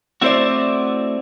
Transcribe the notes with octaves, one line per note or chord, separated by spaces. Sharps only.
A3 C4 E4 F#4 C5 D5